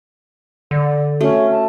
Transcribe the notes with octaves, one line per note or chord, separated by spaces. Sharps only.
D3 D5
A3 C#4 F#4 E5
A5